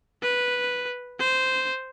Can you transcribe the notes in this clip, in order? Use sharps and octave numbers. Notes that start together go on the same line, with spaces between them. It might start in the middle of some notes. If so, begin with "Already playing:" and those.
B4
C5